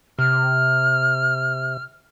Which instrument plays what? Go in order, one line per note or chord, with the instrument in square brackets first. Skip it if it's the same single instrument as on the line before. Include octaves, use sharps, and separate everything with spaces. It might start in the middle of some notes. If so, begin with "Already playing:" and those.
[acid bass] C3 [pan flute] F6